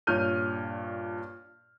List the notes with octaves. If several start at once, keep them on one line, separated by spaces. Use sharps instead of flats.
G2 A#2 C#5 F6 G6 D#7